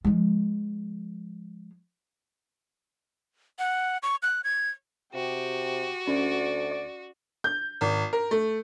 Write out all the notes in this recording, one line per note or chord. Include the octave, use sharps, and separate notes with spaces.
F3 G#3
F#5
C#6
F#6
G#6
C3 F#4 G4
D2 C#4 D5
G6
G#1
A#4
A3